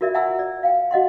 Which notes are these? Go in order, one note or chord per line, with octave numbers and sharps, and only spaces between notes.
F4 F#4 A#4 D5 E5
E5 F#5 G#5 A#5 C6 E6
D5
F5 G5
F#4 D#5 F#5 C6